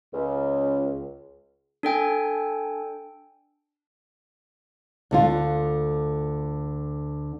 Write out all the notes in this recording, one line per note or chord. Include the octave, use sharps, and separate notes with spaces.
C#2
D4 A4 G5 G#5
D2 D3 F4